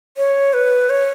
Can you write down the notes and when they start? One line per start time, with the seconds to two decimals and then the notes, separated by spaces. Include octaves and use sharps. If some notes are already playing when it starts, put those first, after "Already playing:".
0.17 C#5
0.53 B4
0.90 C#5